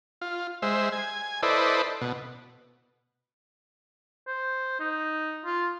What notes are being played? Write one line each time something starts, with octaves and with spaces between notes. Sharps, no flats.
F4
G#3 C5 E5
G#5
E4 A4 B4 C5 D5 D#5
B2
C5
D#4
F4